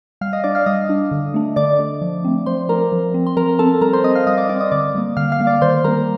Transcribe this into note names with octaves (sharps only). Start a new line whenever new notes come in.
G3 F5 F6
D#5 D#6
D4 D5 D6
F5 F6
G3 D#5 D#6
D4
D3
A3 D4
D3 D5 D6
A3 D4
F3
A3 C4
F3 C5 C6
A3 C4 A#4 A#5
F3
C4
C6
F3 A#4 A#5
C4 A4 A5
G3 A#4 A#5
C5 C6
C4 D#5 D#6
F5 F6
G3 D#5 D#6
D5 D6
C4 D5 D6
D#5 D#6
D3 D5 D6
G3 A#3
D3 F5 F6
F5 F6
G3 A#3
D5 D6
D#3 C5 C6
G3 A#3 A#4 A#5